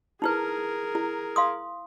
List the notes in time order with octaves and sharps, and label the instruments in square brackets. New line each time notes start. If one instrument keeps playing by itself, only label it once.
[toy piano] D#4 E4 B4 [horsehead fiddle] G#4 A#4
[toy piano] E4
F5 C6 D#6